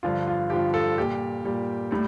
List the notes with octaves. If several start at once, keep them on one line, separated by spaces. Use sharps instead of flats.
G2 D3 F3 F4
F4
G2 D3 F3 G4
A4
A#2 G3 G4
A#2 G3
A2 G3